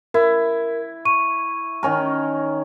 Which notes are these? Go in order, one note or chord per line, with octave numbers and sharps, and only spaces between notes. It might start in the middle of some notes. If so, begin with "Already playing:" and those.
E4 A#4
C#6 D#7
D#3 C#4 A#4